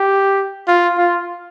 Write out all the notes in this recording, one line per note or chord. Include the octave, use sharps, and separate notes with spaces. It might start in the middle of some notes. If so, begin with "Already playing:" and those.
Already playing: G4
F4
F4